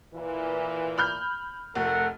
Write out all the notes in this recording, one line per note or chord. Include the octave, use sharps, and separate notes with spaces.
A#2 E3
B5 F6 G6
F1 A3 A#4 F#5